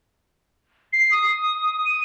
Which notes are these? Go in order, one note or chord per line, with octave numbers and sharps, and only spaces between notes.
C7
D#6
D#7